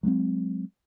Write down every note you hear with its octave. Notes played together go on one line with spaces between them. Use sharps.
F#3 G#3 B3 C4